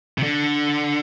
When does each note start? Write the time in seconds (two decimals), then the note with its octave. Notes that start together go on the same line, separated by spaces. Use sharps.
0.18 C3
0.23 D3